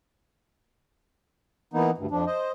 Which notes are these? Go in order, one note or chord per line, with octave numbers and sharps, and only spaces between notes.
E3 A#3 B3 D#4
D2 G2
F2 F3 D4
C5 D#5